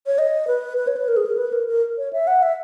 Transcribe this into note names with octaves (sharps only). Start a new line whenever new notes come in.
C#5
D#5
B4
B4
C#5
B4
A#4
G#4
A#4
B4
A#4
A#4
C#5
E5
F#5
E5